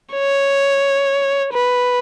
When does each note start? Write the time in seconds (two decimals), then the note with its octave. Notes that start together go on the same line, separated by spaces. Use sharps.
0.14 C#5
1.53 B4